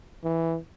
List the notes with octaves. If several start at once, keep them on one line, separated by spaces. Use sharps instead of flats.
E3